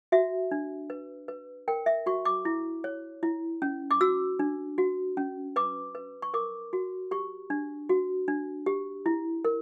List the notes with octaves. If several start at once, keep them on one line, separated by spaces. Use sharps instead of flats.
F#4 E5
D4
B4
B4
A#4 G5
E5
F#4 C#6
D6
E4
C#5
E4
C#4
D6
F#4 E6
D4
F#4
C#4
B4 D6
B4
C#6
A#4 D6
F#4
G4 C#6
D4
F#4
D4
G4
E4
A#4